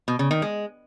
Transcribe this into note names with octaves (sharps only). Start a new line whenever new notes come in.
B2
C#3
D#3
G#3